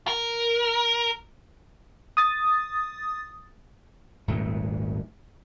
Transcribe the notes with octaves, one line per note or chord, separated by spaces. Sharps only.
A#4
D#6 A6
D#1 G#1 G#2 A3